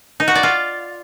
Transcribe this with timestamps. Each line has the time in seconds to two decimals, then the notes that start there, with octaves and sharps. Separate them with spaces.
0.20 D#4
0.28 F#4
0.35 D5
0.43 F4